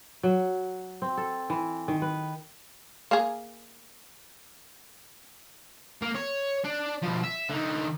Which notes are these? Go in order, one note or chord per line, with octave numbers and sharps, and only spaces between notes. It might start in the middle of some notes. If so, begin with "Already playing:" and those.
F#3
C4
A4
E3
D#3
B4
A#3 G#4
A#3
C#5
D4
B2 F3
E5
D3 D#4